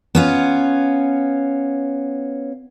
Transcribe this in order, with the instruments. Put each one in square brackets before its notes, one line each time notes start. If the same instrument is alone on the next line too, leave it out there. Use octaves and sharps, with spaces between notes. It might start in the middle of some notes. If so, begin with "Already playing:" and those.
[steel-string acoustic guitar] B3 C#4 F4